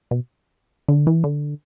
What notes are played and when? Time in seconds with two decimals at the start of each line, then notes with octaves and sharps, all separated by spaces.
0.11 B2
0.88 D3
1.07 E3
1.24 D3